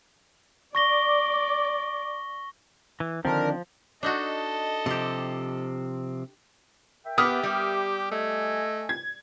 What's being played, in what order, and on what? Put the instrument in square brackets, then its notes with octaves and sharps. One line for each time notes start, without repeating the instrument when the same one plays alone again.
[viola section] D5 [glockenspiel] C#6 A#6 G7
[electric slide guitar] E3
[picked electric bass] D3 D#3 C4 [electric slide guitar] F3 [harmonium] D4 [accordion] A#4
[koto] D4 D#4 F#4 [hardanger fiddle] A4 D#5
[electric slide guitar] C3 F3 C4 [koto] G4 A5
[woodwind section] A#4 E5 G5
[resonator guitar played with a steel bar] B3 [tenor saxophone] G4 [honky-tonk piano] D6 D#6 F6
[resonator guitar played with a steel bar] G3
[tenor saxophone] A3 [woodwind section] D#5 G#5
[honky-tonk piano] G#6